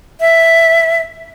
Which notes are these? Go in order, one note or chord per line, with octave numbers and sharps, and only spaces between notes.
E5